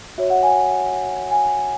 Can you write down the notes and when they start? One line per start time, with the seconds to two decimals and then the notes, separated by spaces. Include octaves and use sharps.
0.18 F#4 C#5 E5
0.30 F#5
0.43 G#5
1.31 G#5